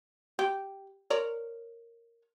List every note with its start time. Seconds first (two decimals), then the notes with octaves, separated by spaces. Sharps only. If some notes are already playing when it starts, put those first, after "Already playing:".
0.39 G4
1.10 A#4 C#5 D5